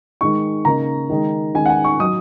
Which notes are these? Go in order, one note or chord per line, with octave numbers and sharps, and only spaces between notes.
D#3 G#3 D#4 C#6
C#3 A#3 D#4 A#5
D#3 G#3 D#4
D#3 G#3 C#4 G#5
F#5
G#5
C#6
F#3 D#4 D#6